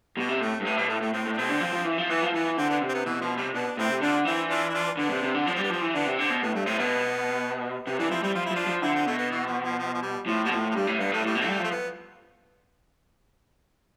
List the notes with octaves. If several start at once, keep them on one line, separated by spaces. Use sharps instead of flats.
B2 G3
C3
A2 A3
G2
A2 B3
B2 G3
A2 A3
A2 A3
A2 C4
A2
D4
B2 C4
D3
F3
F3
E3
F3
E3 B3
F3
E3 B3
D3 C4
B3 D4
C3
C4
B3
B2 E3
B2 F3
C3 G3
B2 B3 D4
D4
A2 C4 E4
C3
D3 D4 F4
E3 C4 E4
D4 F4
E4
D4 F4
D3 B3 D4
C3
C3
D3
F3 D4
G3 C4
B3
F3 C4
E3
D3 B3 D4
C3
D3 C4
B2
A2 B3
G2 A3
A2 C4
B2 B3
C3 B3
E3 B3 D4
F3 C4 E4
G3 C4 E4
F3 F4
E4
F3 D4 F4
F3
D3 C4 E4
C4
B2 A3
B3
E3
F3
F3
F3
F3
G3
A2 F3
B2 G3
A2 F3
F3
G2 G3
A2
G2 B3
A2 A3
A2 G3
B2
A3
G3
F3 A3
B3